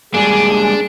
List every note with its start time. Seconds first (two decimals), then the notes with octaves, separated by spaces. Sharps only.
0.14 G3 G#3 A#3 D4 G#4 G#5